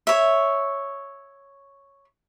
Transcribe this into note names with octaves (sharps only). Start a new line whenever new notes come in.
C#5 E5